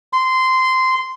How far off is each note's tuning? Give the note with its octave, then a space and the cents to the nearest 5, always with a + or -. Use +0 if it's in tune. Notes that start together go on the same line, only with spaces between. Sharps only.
C6 -15